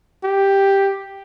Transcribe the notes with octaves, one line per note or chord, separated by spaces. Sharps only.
G4